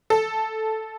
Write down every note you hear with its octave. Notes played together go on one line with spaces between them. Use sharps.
A4